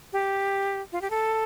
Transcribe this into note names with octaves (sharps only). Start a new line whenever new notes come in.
G4
F4
G4
A4